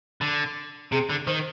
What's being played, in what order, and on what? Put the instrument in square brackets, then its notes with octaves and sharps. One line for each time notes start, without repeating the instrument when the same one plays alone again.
[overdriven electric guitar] D3
[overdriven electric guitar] C3 [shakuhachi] G#4
[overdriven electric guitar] D3
[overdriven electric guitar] D#3 [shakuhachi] C5